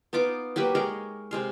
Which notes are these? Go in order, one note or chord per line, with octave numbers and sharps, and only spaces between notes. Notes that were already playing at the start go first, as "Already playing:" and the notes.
B3 D#4 F4 D6
F#3 A#3 G4 B4
G#3 A#4 C#5 D#5
C3 G#3 F5